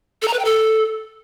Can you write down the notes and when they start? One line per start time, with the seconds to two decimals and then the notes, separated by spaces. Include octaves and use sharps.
0.22 A4
0.28 A#5
0.33 B4
0.39 G5
0.45 A4